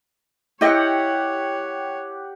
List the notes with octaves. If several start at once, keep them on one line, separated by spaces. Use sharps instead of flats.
E4 G4 C#5 D#5 F#5